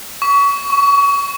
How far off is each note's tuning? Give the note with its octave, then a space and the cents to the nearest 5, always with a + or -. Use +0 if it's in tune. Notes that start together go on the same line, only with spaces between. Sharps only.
C#6 +30
C#6 +0